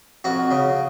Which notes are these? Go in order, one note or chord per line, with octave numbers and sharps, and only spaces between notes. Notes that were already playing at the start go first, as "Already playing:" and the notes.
F2 F#4
C#3